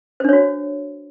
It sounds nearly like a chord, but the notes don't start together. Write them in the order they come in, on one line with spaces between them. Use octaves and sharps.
C5 D4 C#5 F#4